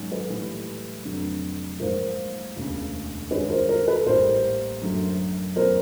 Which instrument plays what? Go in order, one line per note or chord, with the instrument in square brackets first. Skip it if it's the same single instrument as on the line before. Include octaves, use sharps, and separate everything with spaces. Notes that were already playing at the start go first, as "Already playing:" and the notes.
Already playing: [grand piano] G#2 D#3 F#3 A#3 C#4
[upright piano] A4 B4
[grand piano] A2 E3 G3
F1 F2 D3 F#3
[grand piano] G#2 F3 A#3 D#4 [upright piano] A#4 C5
[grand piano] E1 D2 C#3
[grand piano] G2 D#3 G#3 [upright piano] B4 C#5
[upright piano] A#4 C5
A#4 C5
A4 B4
[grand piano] A1 A2 E3 G3 A#3 [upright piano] A#4 C5
[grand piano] F#2 D3 F#3 A3
[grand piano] E2 B2 F#3 A3 C#4 [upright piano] A#4 C5